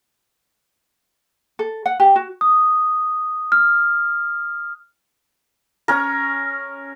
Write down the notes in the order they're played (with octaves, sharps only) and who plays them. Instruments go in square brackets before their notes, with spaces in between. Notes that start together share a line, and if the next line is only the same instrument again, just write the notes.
[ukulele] A4
F#5
G4
F#4
[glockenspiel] D#6
F6
[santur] C#4 A#4